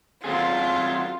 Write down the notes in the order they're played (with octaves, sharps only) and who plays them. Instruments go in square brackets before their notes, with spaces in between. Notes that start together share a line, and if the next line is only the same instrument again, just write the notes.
[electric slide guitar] F#3 C4 G#4 [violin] F4